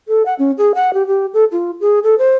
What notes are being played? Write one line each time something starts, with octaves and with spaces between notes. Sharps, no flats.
A4
F#5
C#4
G#4
F#5
G4
G4
A4
F4
G#4
A4
C5